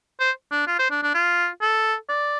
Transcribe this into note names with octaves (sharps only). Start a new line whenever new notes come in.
C5
D4
F4
C5
D4
D4
F4
A4
D5